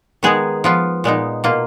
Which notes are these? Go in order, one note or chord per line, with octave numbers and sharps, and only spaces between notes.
D#3 G#3 B3 D#4 G#4
F3 B3 F4
A#2 G#3 B3 D#4
B2 A#3 F4